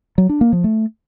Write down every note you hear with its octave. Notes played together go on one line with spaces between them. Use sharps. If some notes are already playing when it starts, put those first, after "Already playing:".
F#3
D4
A#3
F3
A3